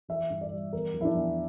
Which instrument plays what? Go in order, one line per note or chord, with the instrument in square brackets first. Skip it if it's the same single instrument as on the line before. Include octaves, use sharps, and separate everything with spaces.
[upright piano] E3 E5
G2
D5
G3
E2 A#4
F3
E4
D4
E2